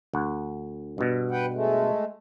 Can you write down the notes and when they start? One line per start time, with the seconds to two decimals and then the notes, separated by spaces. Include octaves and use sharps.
0.14 D2 F#5
0.98 G2 B2
1.31 B4 F#5 G5
1.54 G#3 A3